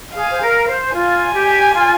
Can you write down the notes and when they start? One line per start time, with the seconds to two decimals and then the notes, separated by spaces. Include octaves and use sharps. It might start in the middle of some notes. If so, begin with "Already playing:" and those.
0.14 G#4 F5
0.31 C5
0.41 A#4
0.68 C5
0.94 F4 G#5
1.34 G4
1.74 F4